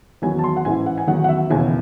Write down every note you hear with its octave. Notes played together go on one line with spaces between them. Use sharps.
E2 D#3 F#3 G#5
A5
C6
F#5
A1 G#2 E3 G#5
F#5
G#5
E2 D#3 F#3 F#5
F#5
E5
E1 D#2 C#3 E3 G#5